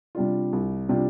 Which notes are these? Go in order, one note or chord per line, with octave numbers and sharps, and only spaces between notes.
C3 G3 D4 F4
C2
C3 G3 D4 F4